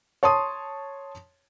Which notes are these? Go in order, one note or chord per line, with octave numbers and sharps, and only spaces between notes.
C#5 A5 C6 D#6